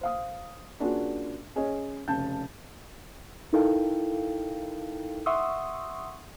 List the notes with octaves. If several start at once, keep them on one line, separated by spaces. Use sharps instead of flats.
C5 F5 D#6
A#3 C#4 D4 F4 F#4 G#4
C#4 G#4 C#5 D#5
F1 C#3 A5 G6
D#4 E4 A4 A#4 F5 G5
E5 F#5 C6 C#6 D#6 E6